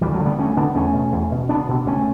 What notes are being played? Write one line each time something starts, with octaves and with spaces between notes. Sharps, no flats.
D2 E3 G3
F#3 A3
D3
G3 B3
D2 A3 C#4
D3 B3 D4
E2 A3 C#4
B2
E2
B2
C#2 B3 D4
B2
C#2 A3 C#4